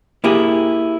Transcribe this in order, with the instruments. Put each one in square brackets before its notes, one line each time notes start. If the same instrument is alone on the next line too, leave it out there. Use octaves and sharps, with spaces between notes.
[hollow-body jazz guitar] A#3 E4 G4 G#4